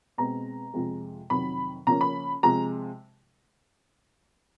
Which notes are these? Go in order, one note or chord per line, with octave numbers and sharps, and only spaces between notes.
B2 G#3 C4 A#5
F2 C3 F3 G#3
F2 C3 D#3 F#3 B5
C#3 F3 A#3 C#4 A#5
B5
C3 F3 G#3 A#5